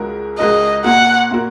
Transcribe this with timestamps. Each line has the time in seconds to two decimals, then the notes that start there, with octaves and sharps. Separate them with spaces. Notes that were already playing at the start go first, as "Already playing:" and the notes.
Already playing: C#2 C#3 G#3 F#4 A#4
0.38 C#2 C#3 G#3 F#4 A#4 D#5
0.84 A#2 A#3 F#4 A#4 F#5
1.31 A#2 A#3 F#4 A#4